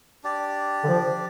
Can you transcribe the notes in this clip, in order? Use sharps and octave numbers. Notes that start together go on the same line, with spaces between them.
D4 G4 D5
D3
F3